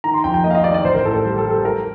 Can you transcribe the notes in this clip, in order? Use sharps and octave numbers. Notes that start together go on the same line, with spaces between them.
D#3 A#5
C6
F2 G5
G5
A#3 D#5
F5
D#5
D#3 D5
D5
A1 C5
A#4
A2 A4
A4
G3 G4
A4
G3
A4
G3 A#4